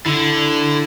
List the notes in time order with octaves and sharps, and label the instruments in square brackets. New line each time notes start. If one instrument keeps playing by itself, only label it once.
[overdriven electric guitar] D3 [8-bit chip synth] E4